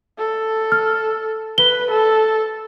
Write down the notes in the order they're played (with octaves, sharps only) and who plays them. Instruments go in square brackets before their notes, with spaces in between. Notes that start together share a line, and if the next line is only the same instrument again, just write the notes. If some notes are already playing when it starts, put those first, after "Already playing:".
[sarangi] A4
[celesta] F6
[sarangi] B4 [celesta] G7
[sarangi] A4